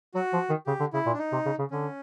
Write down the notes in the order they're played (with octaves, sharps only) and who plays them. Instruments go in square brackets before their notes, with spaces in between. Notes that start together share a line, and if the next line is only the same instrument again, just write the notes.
[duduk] F#3 [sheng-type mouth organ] F#4
[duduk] F3
D#3
[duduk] C#3 [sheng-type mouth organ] G4
[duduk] D3
[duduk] C#3 [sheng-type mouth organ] E4
[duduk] A#2
[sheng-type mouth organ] D4
D#4
[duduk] C3
C#3
C#3
[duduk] D3 [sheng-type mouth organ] C#4